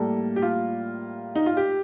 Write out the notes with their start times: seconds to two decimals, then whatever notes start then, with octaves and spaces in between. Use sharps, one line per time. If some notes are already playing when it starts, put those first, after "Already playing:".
Already playing: A2 G3 A#3 A4
0.36 G4
0.42 F4
1.35 D#4
1.46 F4
1.57 G4